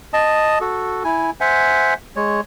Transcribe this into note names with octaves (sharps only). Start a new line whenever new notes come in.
D#5 A5 D#6
F#4 A4
E4 G#5
C5 E5 F#5 G#5
G#3 C#5